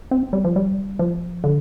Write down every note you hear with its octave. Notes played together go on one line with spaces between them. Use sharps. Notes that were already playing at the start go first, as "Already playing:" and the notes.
C4
G3
F3
G3
F3
D3